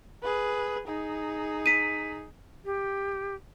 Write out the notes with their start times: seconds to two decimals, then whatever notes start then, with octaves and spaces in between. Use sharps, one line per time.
0.22 G#4 B4
0.88 D#4 G#4
1.66 B6 D#7
2.65 G4